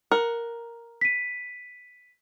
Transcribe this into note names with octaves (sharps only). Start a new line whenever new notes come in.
A#4 F#5
B6 D#7